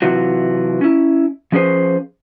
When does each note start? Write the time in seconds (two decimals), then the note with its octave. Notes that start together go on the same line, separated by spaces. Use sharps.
0.02 C3 E3 F#3 F4 F#4
0.81 C#4 E4
1.52 F3 C#4 G#4 B4 C5